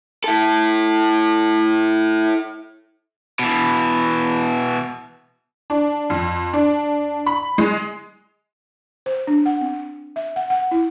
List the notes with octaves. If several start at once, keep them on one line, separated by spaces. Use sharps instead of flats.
E4 A4
B2 E3
D4
F2
D4
B5
G#3
C5
D4
F#5
C4
E5
F#5
F#5
E4